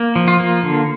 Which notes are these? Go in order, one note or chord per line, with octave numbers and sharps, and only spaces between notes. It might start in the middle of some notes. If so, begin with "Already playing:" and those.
Already playing: A#3
F3
F4
A#3
D3